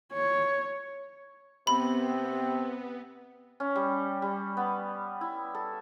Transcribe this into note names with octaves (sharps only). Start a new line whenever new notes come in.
C#5
C3 B3 C4 B5
C#4
G3
G3
B3
E4
A4